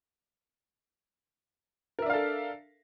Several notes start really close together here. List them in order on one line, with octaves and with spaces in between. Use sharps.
A#4 E5 D4 F5 A4